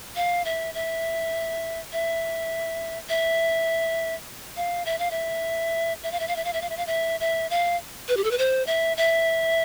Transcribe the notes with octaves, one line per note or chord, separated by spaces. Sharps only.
F5
E5
E5
E5
E5
F5
E5
F5
E5
E5
F5
E5
F5
E5
F5
E5
F5
E5
F5
E5
E5
F5
B4
G4
A4
B4
C5
E5
E5